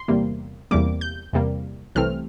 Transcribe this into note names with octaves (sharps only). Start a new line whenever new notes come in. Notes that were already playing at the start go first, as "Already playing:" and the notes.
Already playing: C6
E2 C3 G3 A#3
E2 C3 G3 A#3 D6
G6
E2 C3 G3 A#3
C2 C3 E3 A3 C4 F6